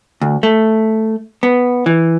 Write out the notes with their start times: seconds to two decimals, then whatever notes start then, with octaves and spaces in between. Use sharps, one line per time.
0.21 D2
0.43 A3
1.43 B3
1.86 E3